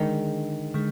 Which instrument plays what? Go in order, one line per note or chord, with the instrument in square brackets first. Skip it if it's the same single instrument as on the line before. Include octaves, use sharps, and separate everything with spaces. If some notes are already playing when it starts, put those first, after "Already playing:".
Already playing: [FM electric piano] D3 G#3 D4 G#4 [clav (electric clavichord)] D#3
[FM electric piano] D3 G#3